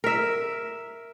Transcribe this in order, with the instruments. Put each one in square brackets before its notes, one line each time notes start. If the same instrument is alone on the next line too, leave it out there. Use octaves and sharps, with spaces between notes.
[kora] A#4 E5